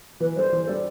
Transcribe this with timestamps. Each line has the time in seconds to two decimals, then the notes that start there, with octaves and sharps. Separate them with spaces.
0.20 E3 B4
0.36 G3 D4 A4 C5
0.52 E3
0.67 G3 D4 A4